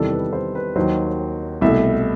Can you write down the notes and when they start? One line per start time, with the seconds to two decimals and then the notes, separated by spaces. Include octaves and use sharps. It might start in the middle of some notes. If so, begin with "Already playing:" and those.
Already playing: E2 C3 D#3 G3 A4
0.12 B4
0.33 C5
0.55 B4
0.75 D#2 D#3 F#3 C5
1.61 C2 B2 A3 E5